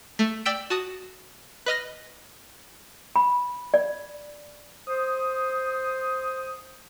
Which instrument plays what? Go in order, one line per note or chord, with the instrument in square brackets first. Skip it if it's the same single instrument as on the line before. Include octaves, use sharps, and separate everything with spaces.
[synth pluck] A3
D5 G5 E6 B6 D7
F#4 A5 D#6
B4 D#5 F6 A#6
[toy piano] B5
D5
[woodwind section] C5 D#6